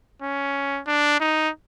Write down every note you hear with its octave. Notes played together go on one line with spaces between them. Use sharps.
C#4
D4
D#4